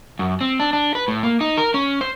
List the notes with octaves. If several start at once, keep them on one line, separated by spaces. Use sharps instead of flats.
F#2
C4
D4
D4
B4
A2
A#3
D#4
A#4
C#4
C5